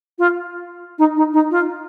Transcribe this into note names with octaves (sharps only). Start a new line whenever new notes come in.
F4
D#4
D#4
D#4
F4